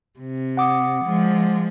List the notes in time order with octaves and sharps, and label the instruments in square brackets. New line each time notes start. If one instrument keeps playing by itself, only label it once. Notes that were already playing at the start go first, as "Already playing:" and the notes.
[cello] C3
[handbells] F#5 D6 D#6
[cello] F3 G#3